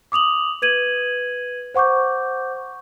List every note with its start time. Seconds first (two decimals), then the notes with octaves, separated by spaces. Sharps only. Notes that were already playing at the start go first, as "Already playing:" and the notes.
0.12 D6 D#6 F7 F#7
0.62 B4 G#6 D#7 F#7
1.74 C5 F#5 C#6 D6 G6